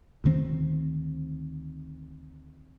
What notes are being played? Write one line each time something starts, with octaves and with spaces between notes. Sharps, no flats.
D2 D#3 C4